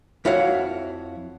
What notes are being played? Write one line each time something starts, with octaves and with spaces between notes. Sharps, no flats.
F2 E4 F#4 C#5 F5